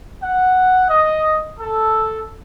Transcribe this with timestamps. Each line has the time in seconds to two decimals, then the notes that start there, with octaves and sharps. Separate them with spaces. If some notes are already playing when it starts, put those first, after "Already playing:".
0.21 F#5
0.88 D#5
1.60 A4